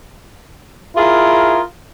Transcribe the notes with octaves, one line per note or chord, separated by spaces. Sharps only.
E4 F4 G#4 A#4